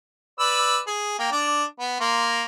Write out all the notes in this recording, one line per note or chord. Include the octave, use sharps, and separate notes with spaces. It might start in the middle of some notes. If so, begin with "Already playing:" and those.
B4 D5 E6
G#4
A#3 G5
D4 D5
B3
A#3 C6